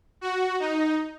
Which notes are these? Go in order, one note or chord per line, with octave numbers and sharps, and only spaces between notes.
F#4
D#4